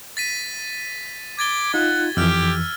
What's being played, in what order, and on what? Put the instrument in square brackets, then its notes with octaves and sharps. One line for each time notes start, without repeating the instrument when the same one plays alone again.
[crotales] A6 B6 D#7
[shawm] D6 [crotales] G#6 A6 G7
[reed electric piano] D#4 F4 [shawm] F#5
[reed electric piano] F2 E3 [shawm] G4 [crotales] E6 F6